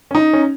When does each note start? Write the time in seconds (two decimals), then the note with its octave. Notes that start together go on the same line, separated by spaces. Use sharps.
0.11 C#4
0.15 D#4
0.33 C#4